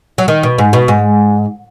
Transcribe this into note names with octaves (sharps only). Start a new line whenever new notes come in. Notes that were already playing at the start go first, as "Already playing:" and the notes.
F#3
D#3
B2
G#2
B2
G#2